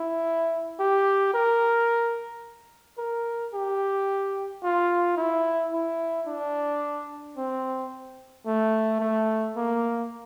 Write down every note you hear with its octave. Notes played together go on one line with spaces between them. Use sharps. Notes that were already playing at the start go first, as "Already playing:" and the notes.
Already playing: E4
G4
A#4
A#4
G4
F4
E4
E4
D4
C4
A3
A3
A#3